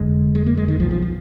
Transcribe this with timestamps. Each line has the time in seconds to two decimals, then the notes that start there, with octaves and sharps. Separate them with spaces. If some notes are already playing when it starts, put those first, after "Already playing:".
Already playing: F1 F2 D3 G#3
0.35 G#3
0.46 A#3
0.57 G#3
0.68 D#3
0.79 B1 F3
0.84 B2
0.91 F3
1.02 F3